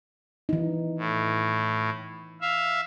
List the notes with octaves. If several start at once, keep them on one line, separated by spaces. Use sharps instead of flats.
E3 D#4
A2
E5 F5